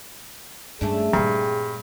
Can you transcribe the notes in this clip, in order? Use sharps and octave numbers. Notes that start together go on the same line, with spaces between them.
G2 A3 C#4 D4 G#4
G2 A#2 G3 C4